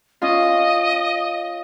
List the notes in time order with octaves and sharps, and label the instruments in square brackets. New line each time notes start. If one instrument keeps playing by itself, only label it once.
[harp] C#4 F4 [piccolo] D#5